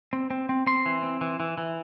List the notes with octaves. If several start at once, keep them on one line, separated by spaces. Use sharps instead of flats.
C4
C4
C4
C4 C6
E3
C4
E3
E3
E3